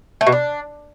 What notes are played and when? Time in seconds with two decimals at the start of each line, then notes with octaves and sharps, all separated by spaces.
0.21 A3
0.27 B2
0.32 D4